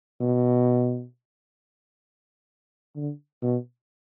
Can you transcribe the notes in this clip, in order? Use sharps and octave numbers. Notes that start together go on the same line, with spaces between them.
B2
D3
B2